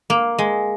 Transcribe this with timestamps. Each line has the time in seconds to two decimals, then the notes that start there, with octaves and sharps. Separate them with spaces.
0.10 A#3
0.38 G#3